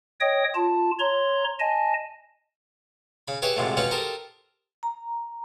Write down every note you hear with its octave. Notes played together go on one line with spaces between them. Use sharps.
C#5 D#5 G5 D#6
F4 A5
C#5 A#5 C6
D#5 G#5 A5
C#3 B5
G4 G#4 B4 C#5 E5 G#5
G#2 C3 F3 F#3 A3
F#3 C#4 D#4 F4 B4
G4 A4 A#4 C5 D#5
A#5